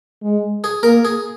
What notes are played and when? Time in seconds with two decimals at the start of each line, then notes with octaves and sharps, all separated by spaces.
0.23 G#3
0.64 G#4
0.83 A#3 A#4
1.05 G#4